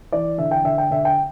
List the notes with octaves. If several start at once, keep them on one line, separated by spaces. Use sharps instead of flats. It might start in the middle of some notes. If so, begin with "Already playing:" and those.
E3 D5
D3 E5
G5
D3 E5
G5
D3 E5
G5